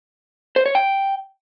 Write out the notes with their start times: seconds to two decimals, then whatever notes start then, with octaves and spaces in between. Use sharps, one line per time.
0.56 C5
0.66 C#5
0.75 G5